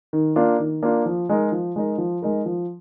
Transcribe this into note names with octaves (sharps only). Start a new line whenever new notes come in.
D#3
A#3 D4 F4
D#3
A#3 D4 F4
F3
G#3 D#4 A#4
F3
G#3 D#4 A#4
F3
G#3 D#4 A#4
F3